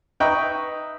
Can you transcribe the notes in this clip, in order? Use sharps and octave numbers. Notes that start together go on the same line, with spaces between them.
D#4 B4 E5 G5 A#5 C#6